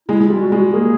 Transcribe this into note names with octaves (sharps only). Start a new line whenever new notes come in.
G#3 E4
G#3
G3 F4
F#4
G#3
F#4
A#3 G#4